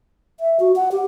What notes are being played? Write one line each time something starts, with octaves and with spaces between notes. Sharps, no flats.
E5
F#4
F#5
G4